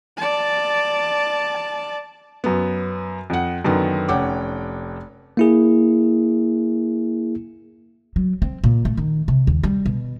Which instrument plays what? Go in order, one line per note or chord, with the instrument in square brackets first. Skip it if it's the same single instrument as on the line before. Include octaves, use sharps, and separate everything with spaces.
[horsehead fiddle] D5 A5
[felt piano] F#2 B3
F2 F#5
F#2 D3 D#3 B3
F1 C#4 F#5 G5 D6
[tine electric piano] A#3 E4 G#4
[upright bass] F#3
C4
A#2
A3
D#3
C3
D#2
G3
B2